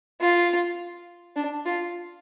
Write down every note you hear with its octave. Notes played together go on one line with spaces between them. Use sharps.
F4
D4
F4